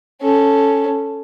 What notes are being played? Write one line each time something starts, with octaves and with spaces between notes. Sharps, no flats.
C#4 A4